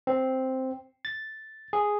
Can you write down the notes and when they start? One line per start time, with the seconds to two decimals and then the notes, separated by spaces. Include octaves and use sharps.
0.07 C4
1.05 A6
1.73 G#4